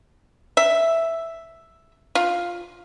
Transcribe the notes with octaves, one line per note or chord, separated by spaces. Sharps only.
E5
F4